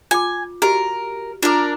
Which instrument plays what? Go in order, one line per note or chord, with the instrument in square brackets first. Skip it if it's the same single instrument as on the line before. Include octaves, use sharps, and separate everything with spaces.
[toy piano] F4 D6 [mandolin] G#5
[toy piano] F#4 G4 D#5 [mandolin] A#4
[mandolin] D4 A#4 [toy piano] F4 D6